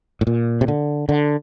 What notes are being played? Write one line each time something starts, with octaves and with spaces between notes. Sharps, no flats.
A2
A#2
C3
D3
D3